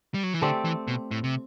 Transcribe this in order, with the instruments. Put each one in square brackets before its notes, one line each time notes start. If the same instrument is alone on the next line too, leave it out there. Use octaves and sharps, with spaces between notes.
[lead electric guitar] G3
F#3
E3
[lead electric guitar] D3 [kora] A3 C4 G4 D5
[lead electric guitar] E3
B2
A2
C3